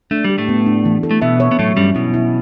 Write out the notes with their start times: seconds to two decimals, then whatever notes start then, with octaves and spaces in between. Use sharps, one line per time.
0.11 A3 D4
0.24 G3
0.30 G4
0.38 A2 A3
0.49 B3
0.66 D4
0.85 E3
1.03 A4
1.11 A3
1.22 B2 B3 E5
1.40 C#5
1.51 B3
1.59 A2 F#3 A3
1.77 G2 G3 C#4
1.95 B2 E4
2.14 E4